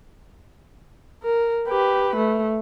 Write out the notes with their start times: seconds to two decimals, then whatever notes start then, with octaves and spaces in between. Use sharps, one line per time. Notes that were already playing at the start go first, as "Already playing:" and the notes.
1.23 A#4
1.68 G4 B4
2.16 A3